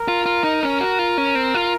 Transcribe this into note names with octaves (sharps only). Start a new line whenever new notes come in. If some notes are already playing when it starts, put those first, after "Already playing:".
Already playing: A#4
F4
F4
D#4
C#4 A#4
F#4
F4
C#4
C4
F4